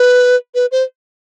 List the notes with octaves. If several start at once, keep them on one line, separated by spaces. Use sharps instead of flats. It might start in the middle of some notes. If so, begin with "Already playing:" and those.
Already playing: B4
B4
C5